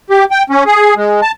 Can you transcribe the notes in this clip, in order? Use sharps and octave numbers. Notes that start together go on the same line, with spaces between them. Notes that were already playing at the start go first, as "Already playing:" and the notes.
G4
G5
C#4
G#4
G#3
A5